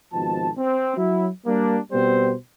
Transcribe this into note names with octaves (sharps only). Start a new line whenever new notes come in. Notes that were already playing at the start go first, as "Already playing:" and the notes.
G#1 B2 F3 A5
C4
F#3 E4
G3 A#3 D4
B2 G3 B3 C4 C5